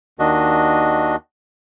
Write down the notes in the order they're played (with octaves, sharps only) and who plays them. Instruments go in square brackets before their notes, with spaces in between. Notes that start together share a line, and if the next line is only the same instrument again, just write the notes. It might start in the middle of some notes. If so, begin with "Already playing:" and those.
[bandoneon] D#2 D#3 D4 F#4 D#5